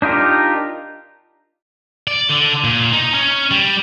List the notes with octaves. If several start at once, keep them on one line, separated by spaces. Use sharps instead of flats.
D4 D#4 F4 G4 A#4
D5
D3
A#2
D#4
C#4
G3